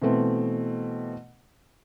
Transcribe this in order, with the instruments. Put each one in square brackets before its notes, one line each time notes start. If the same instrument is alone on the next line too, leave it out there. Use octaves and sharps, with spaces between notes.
[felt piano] B2 E3 A3 C4